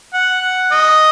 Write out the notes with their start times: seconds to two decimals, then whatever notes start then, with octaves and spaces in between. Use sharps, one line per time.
0.14 F#5
0.72 D#5